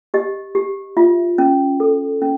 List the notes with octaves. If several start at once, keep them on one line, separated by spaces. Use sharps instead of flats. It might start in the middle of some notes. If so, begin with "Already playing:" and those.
G4 D#5
G4
F4 E5
C#4
A4
C#4